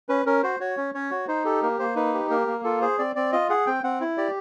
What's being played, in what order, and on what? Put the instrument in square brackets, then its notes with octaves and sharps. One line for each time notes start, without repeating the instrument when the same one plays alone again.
[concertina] C#4 B4
C#4 A#4
F#4 C5
F#4 C#5
C#4
C#4 C#5
F#4
D#4 C5
G4 A4
A#3 A#4
A#3 C5
D#4 B4
G4
A#3 A#4
A#3
F4 A4
G#4 C5
C4 D5
C4 D5
F4 D#5
G#4 F#5
C4 G5
C4 F#5
E4
G4 D5